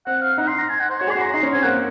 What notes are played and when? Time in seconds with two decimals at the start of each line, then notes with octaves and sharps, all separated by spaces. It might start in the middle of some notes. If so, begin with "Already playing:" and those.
0.06 C4 F#5
0.22 F5
0.38 D#4 F#5
0.48 C6
0.58 A#5
0.69 G#5
0.80 F#5
0.90 C5
1.00 F#4 C#5
1.07 G#4
1.11 C6
1.16 F#4
1.21 A#5
1.32 D#4 C6
1.43 C#4
1.53 C4 G#5
1.63 A#3 F#5